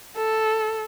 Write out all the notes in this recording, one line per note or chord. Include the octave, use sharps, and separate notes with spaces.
A4